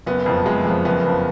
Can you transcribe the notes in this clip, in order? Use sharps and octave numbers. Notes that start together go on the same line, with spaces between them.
F#1 B3
F2 F3
F#1 G#3
F2 F3
F#1 B3
F2 F3